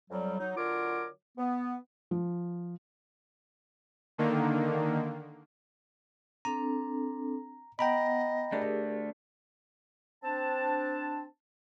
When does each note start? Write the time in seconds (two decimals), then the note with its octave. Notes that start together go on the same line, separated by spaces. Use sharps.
0.10 F2 F#3 G3
0.39 F#3 D#4
0.57 D3 F#3 F4 A#4 C#5 D6
1.37 B3
2.11 F3
4.18 D3 D#3 A#3
6.45 C4 D4 A4 A#5
7.79 B3 D#5 F#5 G5 A#5 B5
8.52 A3 D4 G4 G#4 A#4
10.23 C4 D4 A5